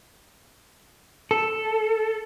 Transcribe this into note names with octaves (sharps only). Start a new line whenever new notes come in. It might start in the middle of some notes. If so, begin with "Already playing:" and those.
A4